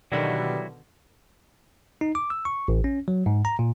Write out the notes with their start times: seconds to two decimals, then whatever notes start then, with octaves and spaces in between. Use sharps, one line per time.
0.12 B2 D3 D#3 F#3 G3 E4 F#4
2.01 D#4
2.15 D6
2.30 E6
2.45 C#6
2.68 A1
2.84 C#4
3.08 F#3
3.26 G#2
3.45 A#5
3.59 A#2